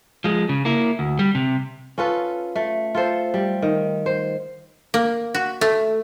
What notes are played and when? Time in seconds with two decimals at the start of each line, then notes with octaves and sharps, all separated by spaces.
0.24 F3 G#3
0.49 C#3
0.65 A#3 E4
0.99 D2
1.19 G3
1.35 C3
1.98 C#4 F4 A4 B4
2.56 A3
2.95 F4 A4 C5
3.34 G3
3.62 D#3
4.06 C5
4.94 A#3
5.34 F#4
5.61 A3